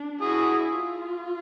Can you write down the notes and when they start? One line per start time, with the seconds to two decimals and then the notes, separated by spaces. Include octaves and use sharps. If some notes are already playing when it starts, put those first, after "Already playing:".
Already playing: D4
0.21 E4 F#4 G#4
0.75 F4